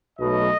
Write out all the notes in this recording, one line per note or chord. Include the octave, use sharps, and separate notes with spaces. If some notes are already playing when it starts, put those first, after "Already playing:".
B1 B2 F#3 A3 D#5